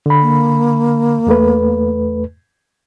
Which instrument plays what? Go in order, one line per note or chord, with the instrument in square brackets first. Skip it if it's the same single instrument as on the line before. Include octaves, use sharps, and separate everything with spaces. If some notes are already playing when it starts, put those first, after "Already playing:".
[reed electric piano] D3 B5
[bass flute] A#3
[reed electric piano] E2 A3 B4